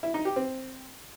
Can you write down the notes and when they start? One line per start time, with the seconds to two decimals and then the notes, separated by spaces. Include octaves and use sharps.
0.03 E4
0.14 D#4
0.25 G4
0.36 C4